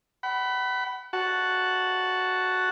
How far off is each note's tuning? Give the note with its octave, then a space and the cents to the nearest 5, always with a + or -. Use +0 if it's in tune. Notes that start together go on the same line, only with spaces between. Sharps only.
F#5 +35 B5 +0
F#4 +0 F#5 +0 A5 +0